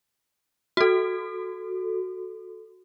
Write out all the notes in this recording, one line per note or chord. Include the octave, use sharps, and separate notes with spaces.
F#4 A4